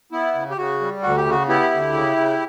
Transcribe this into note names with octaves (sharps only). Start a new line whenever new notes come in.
B3 E4
C#3
G4
C#3 F#4
G3
D2 F#4
G4
C#3 F#4
B3 E4 G4
D2
C#3
C#3